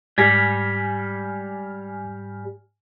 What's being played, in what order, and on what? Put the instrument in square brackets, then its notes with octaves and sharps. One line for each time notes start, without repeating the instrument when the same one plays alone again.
[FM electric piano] G#2 G#5 F6 [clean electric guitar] G3 [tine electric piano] G#6 A#6 B6